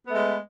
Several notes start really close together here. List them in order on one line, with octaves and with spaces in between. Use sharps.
B3 A3 G#3